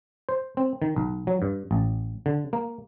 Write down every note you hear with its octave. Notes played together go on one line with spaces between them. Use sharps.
C5
C4
D#3
B1
F#3
G2
A1
D3
A#3